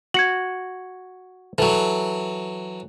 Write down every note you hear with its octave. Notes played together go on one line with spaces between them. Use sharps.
F#4 G#6 C#7 F#7
E3 F#3 A4